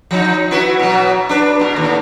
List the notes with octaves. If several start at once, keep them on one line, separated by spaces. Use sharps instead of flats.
F3 D#4
E4 F#4 B4
B2 F#3
D4 B4
B2 F4 A#4
D#2 A2